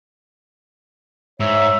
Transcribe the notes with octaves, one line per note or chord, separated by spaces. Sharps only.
G#2 C#5 E5